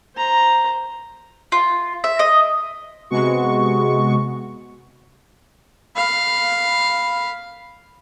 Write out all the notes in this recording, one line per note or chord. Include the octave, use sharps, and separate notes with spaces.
C5 A#5
F4
E5
D#5
C3 G#3 B3 F#4 C#6
F5 B5